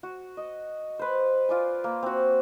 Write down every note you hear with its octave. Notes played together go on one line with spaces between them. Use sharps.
F#4
D#5
B4 C5
F4 D5 G#5
A#3
C4 F#4